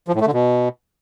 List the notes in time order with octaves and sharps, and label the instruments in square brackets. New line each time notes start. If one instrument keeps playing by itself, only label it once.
[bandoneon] F3
A2
A3
D3
B2